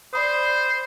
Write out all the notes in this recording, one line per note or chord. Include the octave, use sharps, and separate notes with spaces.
C5 D5 B5 D#6